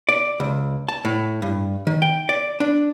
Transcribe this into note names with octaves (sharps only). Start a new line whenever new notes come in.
D5
C#2
A5
A2
G2
D#3
G5
D5
D4